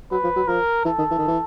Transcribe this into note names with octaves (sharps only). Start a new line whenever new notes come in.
F#3 B4
F3
F#3
F3 A#4
E3 A4
D#3
E3
D#3
E3